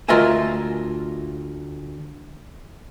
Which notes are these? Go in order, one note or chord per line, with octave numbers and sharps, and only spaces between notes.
D2 F4 A#4 D#5 E5 G#5